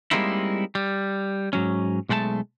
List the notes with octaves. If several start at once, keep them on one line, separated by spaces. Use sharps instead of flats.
G3 G#3 A#3 C4 D#4 E4
G3
G#2 F#3 C#4
B1 G#3 A3 F#5 A5